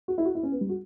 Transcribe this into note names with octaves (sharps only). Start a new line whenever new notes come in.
F#4
E4
F#4
E4
C#4
B3
G3
F#4